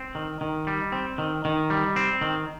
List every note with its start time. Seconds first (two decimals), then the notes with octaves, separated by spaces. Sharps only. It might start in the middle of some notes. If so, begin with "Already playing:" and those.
Already playing: C4
0.15 D#3
0.41 D#3
0.67 G3
0.92 C4
1.18 D#3
1.45 D#3
1.70 G3
1.96 C4
2.21 D#3